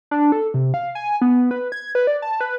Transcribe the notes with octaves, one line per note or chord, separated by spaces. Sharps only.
D4
A4
C3
F5
G#5
B3
B4
G#6
B4
D5
A5
B4